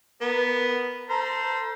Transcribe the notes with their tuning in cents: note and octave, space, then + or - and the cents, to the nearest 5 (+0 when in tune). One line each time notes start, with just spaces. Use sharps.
B3 +0 A#4 +0
A4 +30 C5 -10 A#5 +35